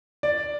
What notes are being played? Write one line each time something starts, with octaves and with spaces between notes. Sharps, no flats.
D5